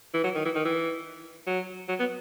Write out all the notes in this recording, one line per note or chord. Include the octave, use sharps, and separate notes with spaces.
E3
F#3
D#3
E3
D#3
E3
F#3
F#3
B3